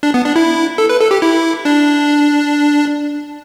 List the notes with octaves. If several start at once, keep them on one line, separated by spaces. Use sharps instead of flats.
D4
B3
D4
E4
A4
B4
A4
G4
E4
D4